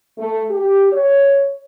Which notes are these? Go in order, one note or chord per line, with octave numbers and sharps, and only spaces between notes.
A3
G4
C#5